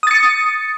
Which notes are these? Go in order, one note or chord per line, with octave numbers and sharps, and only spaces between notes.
D#6 A6 C#7